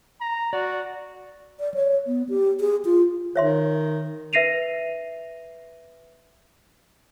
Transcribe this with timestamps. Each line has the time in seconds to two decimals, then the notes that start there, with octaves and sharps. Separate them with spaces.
0.21 A#5
0.53 F#4 D5
1.60 D5
1.74 C#5
2.07 B3
2.29 G4
2.60 G#4
2.85 F4
3.36 D#3 C#5 E5 C6
4.33 B4 E5 A#6 C7 D#7 F7